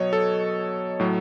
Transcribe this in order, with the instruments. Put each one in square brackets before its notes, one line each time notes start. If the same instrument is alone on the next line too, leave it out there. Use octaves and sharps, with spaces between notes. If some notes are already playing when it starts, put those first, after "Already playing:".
Already playing: [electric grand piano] B2 F#3 C#5 D#5
A4
A2 F#3